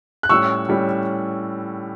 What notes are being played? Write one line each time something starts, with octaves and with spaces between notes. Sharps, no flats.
F#6
A2 G3 C#4 C#6 E6
A2 G3 C#4